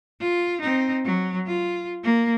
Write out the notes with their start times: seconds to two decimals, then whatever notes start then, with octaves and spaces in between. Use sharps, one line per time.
0.20 F4
0.61 C4 D#4
1.05 F#3
1.47 F4
2.04 A#3